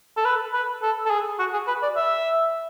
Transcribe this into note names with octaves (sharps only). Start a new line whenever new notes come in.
A4
B4
B4
A4
A4
G#4
F#4
G#4
B4
D5
E5